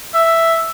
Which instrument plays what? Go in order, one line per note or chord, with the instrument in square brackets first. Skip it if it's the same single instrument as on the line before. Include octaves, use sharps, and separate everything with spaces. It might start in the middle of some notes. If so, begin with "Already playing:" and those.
[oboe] E5